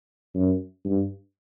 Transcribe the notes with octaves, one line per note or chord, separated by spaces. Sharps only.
F#2
G2